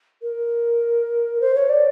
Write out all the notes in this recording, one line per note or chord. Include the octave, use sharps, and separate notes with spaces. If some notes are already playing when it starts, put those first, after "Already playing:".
A#4
C5
C#5
D5